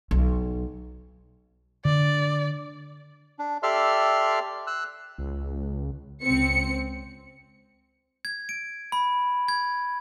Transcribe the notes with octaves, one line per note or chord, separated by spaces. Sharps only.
B1
D3 D5
D4
G4 A4 D5 E5 C6 F6
E6 F#6
C#2
C#2 C4 C#7
G#6
D7
B5
G#6